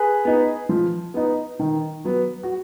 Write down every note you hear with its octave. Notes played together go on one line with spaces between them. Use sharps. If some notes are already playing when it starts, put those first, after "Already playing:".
Already playing: G#4 B4
B3 D#4
F3
B3 D#4
D#3
F#3 B3
F#4